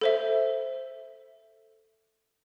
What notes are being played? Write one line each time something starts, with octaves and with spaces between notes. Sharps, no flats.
A4 C5 E5